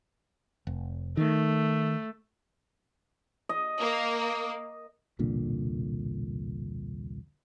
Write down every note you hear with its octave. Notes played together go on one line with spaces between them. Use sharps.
F1
D#3 A3
D#5
A#3
E1 C2 A#2 D3